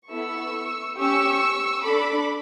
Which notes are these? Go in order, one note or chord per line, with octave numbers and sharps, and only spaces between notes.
B3 E4 A4 C#6 E6
C#4 G4 C#6 E6
D4 A4 B5 D6